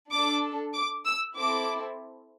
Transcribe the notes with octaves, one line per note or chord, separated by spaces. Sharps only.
D4 A4 D6
D6
E6
C4 E4 A4 D6